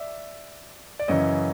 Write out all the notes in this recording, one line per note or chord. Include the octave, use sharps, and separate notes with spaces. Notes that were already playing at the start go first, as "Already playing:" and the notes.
Already playing: D5 E5
D5
F#2 C#3 E3 C#5 D#5